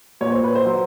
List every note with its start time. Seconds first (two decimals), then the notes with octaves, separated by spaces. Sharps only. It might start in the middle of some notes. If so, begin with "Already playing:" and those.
0.21 A#2 C#5
0.32 C5
0.44 B4
0.55 C5
0.65 F#3